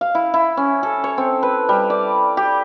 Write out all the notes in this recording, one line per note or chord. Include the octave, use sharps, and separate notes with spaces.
F5
E4
E4
C#4
A4
C#5
C4
B4
G3
D5
G4